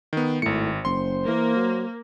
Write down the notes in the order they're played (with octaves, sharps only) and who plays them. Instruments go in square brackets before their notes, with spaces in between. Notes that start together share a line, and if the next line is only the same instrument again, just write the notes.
[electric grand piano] D#3 B3
[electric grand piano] G#1 C#7 [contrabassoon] A2
[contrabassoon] F#1 [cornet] C5 [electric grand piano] C6
[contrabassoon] E3 [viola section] A#3
[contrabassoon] F#3